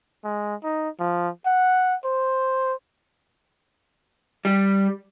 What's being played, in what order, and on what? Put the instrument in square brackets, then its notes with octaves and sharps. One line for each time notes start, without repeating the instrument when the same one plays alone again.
[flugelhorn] G#3
D#4
F3
F#5
C5
[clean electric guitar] G3